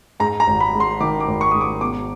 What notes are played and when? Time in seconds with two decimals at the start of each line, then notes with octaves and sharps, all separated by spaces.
0.20 G#2 A#5
0.40 A#5
0.47 G#1
0.60 B5
0.74 G#2
0.80 C6
1.00 D#3 D6
1.20 D6
1.28 G#1
1.41 C#6
1.51 G#2 D#6
1.61 D6
1.81 B2 D6